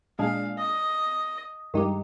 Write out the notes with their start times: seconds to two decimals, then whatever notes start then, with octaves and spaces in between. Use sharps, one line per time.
0.19 A#2 G#3 D4 G#4 F5
0.58 D#5
1.74 G2 D#3 G#3 D#4 G4